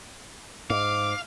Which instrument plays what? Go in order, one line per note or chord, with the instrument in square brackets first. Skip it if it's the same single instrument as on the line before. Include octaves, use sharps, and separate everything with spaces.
[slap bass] G#2 [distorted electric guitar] F5 [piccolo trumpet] D6